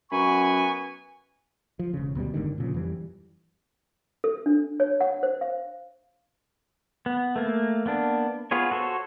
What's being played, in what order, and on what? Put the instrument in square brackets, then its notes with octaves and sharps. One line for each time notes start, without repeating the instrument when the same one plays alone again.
[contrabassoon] F#2 [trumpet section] B3 G#5 [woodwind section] B4 B5 C#6
[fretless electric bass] F3
E1 C#3
D2 B2 F#3 G3
F#1 G#2 D3 D#3
A#2 C#3 F3
F2 E3 G3
[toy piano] A4
D4
C#5
F#5
C5
F5
[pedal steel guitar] B3
A3 A#3
A#3 B3 D4
B3 F4 G#4 C#5
F#4 A4 C5 C#5